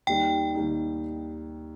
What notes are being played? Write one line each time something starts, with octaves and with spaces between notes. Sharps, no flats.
D#2 D#3 G3 D#4 G5
D#2 D#3 G3 D#4